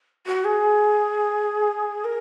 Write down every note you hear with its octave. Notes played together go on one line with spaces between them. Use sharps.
F#4
G#4
A#4